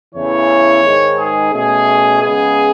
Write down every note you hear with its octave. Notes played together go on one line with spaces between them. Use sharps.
E2 C#3 E3 A3 C#5
G#2 D#3 G#3
G#4
B2 A3 C#4 G#4
C#3 G#3 B3 G#4